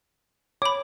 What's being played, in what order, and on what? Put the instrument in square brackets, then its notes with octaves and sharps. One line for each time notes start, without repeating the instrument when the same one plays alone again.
[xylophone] C#5 B5 [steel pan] D6